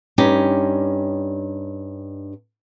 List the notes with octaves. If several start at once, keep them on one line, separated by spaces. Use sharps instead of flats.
G2 C#4 D#4 G4